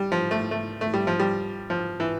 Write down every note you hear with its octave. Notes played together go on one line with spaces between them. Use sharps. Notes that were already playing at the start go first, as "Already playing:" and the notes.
Already playing: G3
F3
A3
A3
A3
G3
F3
G3
F3
E3